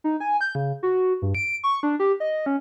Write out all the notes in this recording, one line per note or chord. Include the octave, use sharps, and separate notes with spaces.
D#4
G#5
G6
C#3
F#4
G2
D7
C#6
D4
G4
D#5
C#4